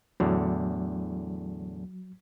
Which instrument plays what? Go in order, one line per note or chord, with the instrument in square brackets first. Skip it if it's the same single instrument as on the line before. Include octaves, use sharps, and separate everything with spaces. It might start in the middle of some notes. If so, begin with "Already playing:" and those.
[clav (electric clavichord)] E2 A2 D3 [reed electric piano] F#3